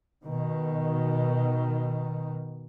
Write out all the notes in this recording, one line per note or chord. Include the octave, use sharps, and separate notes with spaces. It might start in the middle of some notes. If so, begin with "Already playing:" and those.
B2 D#3